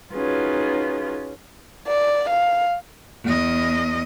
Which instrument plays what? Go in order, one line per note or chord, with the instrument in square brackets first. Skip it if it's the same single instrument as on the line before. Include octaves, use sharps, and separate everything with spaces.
[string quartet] C#4 D#4 F4 F#4 G#4 B4
[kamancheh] D5
F5
[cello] E2 D#5